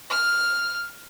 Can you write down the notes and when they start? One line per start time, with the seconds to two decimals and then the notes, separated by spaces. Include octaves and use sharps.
0.10 F6